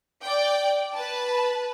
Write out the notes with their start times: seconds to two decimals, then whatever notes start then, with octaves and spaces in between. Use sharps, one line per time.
0.23 D5 G5
0.93 B4 A5